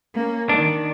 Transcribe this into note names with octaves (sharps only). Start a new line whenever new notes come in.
A#3 C#4
D#3 D4